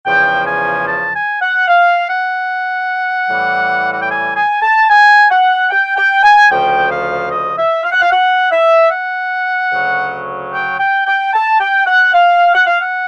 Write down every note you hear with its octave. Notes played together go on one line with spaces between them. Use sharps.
E2 C#3 F3 G5
G#5
A5
G#5
F#5
F5
F#5
A2 E3 G3
F#5
G5
G#5
G#5
A5
G#5
F#5
G5
G5
G#5
D2 C#3 F3 G5
F5
D#5
E5
F5
F#5
F5
F#5
E5
F#5
D2 C#3 F#3
G5
G5
G5
A5
G5
F#5
F5
F#5
F5
F#5